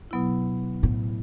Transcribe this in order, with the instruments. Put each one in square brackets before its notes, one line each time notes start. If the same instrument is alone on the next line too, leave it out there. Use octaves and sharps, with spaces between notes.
[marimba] B2 F#3 B3 E4
[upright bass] A2